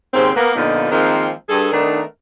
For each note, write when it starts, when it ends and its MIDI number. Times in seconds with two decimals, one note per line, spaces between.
0.13 0.30 39
0.13 0.30 44
0.13 0.30 49
0.13 0.30 60
0.36 0.53 58
0.36 0.53 59
0.55 0.90 46
0.55 0.90 50
0.55 0.90 53
0.55 0.90 59
0.55 0.90 63
0.92 1.30 51
0.92 1.30 53
0.92 1.30 56
0.92 1.30 58
0.92 1.30 60
1.49 1.71 43
1.49 1.71 68
1.49 1.71 69
1.72 2.02 51
1.72 2.02 57
1.72 2.02 59
1.72 2.02 62
1.72 2.02 63
1.72 2.02 70